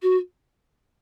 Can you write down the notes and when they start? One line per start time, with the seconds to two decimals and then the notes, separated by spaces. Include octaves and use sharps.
0.02 F#4